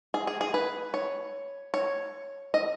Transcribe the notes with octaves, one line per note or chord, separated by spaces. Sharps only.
G#4
G#4
G#4
B4
C#5
C#5
D#5